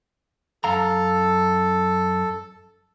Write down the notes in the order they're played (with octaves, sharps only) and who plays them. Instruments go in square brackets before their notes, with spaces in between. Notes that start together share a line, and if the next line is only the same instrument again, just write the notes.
[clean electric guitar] F#2 F5 A#5 [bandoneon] A4